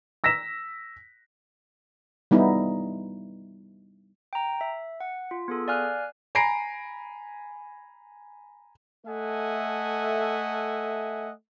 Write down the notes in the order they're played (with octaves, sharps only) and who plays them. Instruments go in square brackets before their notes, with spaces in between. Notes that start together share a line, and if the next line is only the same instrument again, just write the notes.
[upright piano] E6 A#6 B6 E7
[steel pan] G3 B3 D#4 E4
[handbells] G5 A#5
E5
F#5
F4
B3 G#4 A4
D5 F5 G#5 F6 F#6
[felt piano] G#5 A#5 B5 A#6 C7 D7
[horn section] A3 A4 D#5 E5 F#5 G#5